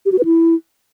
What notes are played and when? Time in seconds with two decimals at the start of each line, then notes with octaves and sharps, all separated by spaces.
0.06 G4
0.12 F#4
0.19 B4
0.25 E4